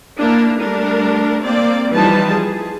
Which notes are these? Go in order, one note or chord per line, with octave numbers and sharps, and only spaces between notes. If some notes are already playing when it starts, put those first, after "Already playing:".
A#3 D4 E4 A#4
G3 A3 D4 A#4
A#3 C4 D5
E3 F3 G3 D#4 B4 A5
G#4